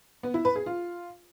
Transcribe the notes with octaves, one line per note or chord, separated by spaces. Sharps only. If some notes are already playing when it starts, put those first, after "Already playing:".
B3
E4
B4
G#4
F4